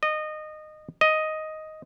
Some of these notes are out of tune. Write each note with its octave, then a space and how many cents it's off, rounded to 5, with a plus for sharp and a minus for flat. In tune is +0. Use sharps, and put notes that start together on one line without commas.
D#5 -20
D#5 +5